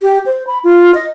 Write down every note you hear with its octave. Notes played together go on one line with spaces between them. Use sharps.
G4
C5
B5
F4
D#5